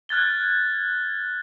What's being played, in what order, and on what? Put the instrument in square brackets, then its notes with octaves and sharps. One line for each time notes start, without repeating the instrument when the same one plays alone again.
[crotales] F6 F#6 G#6 A6 G7